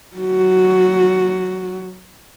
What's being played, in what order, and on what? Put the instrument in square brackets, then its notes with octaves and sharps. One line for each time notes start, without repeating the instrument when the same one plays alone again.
[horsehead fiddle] F#3 F#4